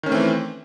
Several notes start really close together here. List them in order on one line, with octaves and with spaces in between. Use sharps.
D#3 C#4 A3 C4 E3